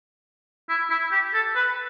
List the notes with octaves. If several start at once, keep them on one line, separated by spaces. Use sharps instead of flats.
E4
E4
G4
A4
B4